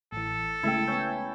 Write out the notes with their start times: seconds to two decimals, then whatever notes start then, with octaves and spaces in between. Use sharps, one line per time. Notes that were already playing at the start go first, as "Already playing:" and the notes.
0.12 A1 E3 A4
0.63 C#3 G#3 A3 E4 G5
0.88 B3 C#4 G6